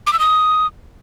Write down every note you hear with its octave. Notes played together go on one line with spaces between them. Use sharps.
D6
E6
D#6